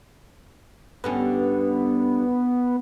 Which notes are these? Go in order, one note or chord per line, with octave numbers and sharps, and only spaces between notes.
G2 D3 B3 C#4